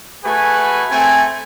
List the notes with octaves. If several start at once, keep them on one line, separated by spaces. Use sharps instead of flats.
A3 F#4 G#4 B4 G#5
A3 C4 G#5